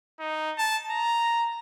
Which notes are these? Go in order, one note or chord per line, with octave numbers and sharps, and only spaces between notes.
D#4
A5
A#5